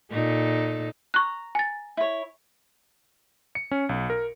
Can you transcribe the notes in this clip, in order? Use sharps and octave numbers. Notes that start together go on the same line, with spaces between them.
A#2 D#4 A4
A#5 C#6 F#6
G#5 A6
E4 C#5
C#7
C#4
B1
A#4